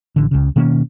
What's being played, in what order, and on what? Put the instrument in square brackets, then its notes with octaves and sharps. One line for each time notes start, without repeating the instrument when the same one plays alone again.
[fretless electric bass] A1 D3
C#2 C#3
B2 D#3 A#3 C#4